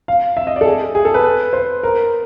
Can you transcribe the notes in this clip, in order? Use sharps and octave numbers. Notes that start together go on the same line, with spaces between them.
F5
E5
D#5
A4 D5
G#4
G#4
A4
B4
C5
A#4